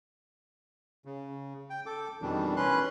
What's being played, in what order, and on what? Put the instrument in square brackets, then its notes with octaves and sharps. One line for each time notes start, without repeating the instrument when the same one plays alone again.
[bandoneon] C#3
G5
A4 D6
F2 B2 D#3 E3 G3 D4
C#4 B4 C6 F#6